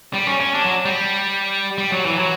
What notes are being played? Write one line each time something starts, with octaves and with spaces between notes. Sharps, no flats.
G3
C#4
C#4
D4
F#3
G3
G3
F#3
E3
F#3